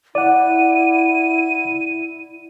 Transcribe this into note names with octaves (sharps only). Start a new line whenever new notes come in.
E4 D5 F#5 D#7